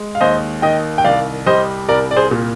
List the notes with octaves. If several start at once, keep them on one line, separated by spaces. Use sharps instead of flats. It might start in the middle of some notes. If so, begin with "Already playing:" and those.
Already playing: G#3
F5
D#2 C5 D#5
D#3 D#5 G5
G5
C2 D5 F5
G3 C5 D#5
C2 A#4 D5
D5
G#4 C5
A#2